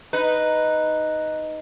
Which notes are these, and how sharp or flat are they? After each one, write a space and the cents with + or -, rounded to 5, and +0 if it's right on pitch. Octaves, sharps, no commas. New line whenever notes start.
D#4 +0 B4 +0